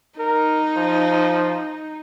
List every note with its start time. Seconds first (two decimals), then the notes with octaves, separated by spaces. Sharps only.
0.19 D#4 A#4
0.77 F3